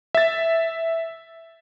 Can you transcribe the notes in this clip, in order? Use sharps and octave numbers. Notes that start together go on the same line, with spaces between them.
E5 A6